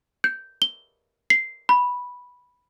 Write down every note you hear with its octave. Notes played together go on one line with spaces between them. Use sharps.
G6
G7
C7
B5